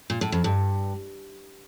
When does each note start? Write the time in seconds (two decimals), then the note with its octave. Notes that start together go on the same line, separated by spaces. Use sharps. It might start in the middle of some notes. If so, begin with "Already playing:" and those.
0.10 A#2
0.21 A2
0.32 F2
0.44 G2